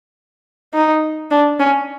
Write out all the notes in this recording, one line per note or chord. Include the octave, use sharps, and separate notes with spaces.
D#4
D4
C#4